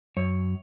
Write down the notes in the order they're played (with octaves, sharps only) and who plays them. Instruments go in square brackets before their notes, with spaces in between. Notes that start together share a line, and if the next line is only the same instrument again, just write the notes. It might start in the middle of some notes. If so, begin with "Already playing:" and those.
[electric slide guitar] F#2 C#5